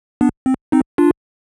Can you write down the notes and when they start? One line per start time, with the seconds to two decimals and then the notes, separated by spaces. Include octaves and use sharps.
0.21 B3 D4
0.46 C4
0.72 C4 D#4
0.98 D4 F4